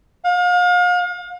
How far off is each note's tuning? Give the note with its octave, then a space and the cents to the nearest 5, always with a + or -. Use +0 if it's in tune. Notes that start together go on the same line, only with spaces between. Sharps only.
F5 +40